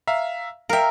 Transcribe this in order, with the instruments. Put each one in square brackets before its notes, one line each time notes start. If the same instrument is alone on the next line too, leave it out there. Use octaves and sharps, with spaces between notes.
[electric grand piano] E5 F5 A#5
[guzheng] A#4 E5 [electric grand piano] F5 G5